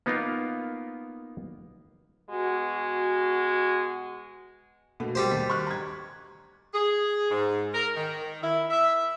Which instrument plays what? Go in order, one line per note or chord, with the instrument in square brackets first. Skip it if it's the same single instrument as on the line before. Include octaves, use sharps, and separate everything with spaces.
[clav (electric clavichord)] A#3 B3 D#4 F4 A#4 F5
[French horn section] B2 G#3 F#4
[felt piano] B2 A3 A#3
[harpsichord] G3 G4 C5
[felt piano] D#2 B6
C#6 F6 F#6
A#5 G#6
[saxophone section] G#4
G#2
A#4
D#3
E4
E5